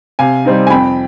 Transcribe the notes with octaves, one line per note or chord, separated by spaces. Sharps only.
C3 F5 G#5
G3 C4 D#4
G#5
F2 G5 B5